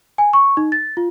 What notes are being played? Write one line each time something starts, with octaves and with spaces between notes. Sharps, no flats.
G#5
C#6
D#4
A6
F4